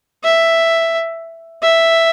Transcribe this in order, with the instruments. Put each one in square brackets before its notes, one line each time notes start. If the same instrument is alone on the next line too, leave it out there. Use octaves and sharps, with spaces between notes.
[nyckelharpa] E5
E5